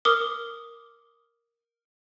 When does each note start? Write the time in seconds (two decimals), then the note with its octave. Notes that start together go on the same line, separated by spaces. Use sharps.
0.05 A#4 D6 D#6 G7